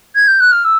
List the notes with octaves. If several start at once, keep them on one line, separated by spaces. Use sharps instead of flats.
G#6
G6
F#6
F6
E6